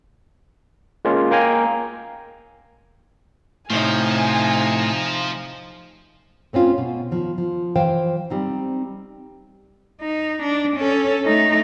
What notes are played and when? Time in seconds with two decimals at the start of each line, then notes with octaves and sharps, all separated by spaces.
1.05 G#3 A#3 C#4 F4
1.31 A#3 F5 G5 G#5 A#5
3.70 A2 C3 F3 D#4 G#5
6.53 A3 C4 C#4 F4
6.78 B2
7.11 D#3 F3
7.38 F3
7.76 E3 F3 C5 F5 G5
8.30 G3 C4 D#4
10.01 D#4
10.43 D4
10.77 C#4 A4
11.26 A3 D#4